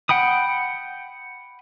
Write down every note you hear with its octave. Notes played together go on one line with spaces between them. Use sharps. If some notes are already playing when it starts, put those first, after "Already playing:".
F#5 G5 B5 D#6